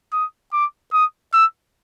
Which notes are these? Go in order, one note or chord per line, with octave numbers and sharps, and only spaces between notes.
D#6
D6
D#6
E6